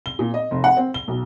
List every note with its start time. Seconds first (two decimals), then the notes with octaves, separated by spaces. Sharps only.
0.06 G7
0.19 A#2
0.34 D#5
0.51 F1
0.64 F#5
0.77 C4
0.94 G7
1.08 B1